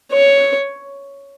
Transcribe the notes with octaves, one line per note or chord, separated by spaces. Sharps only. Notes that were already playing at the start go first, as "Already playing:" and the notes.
C#5